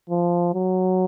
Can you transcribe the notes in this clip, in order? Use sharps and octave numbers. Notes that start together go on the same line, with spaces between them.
F3
F#3